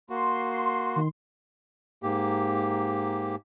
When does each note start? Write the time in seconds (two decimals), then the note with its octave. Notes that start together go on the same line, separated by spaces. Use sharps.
0.10 A#3 F#4 C6
0.96 D#3
2.03 G#2 A#3 G4